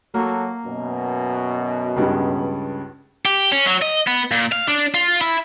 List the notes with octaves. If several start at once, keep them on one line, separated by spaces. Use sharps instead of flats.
F#3 A#3 F#4 A4
F#2 B2
C#2 G2 C#3
G4
C#4
F#3
D#5
B3
A#2
F5
D4
F4
E4